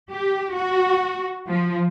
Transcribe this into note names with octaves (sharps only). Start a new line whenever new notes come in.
G4
F#4
F3